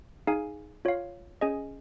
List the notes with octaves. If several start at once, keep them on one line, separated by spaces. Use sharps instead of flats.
D#4 G#4 F5 G#5
F4 C#5 F5
C#4 G#4 D#5 G#5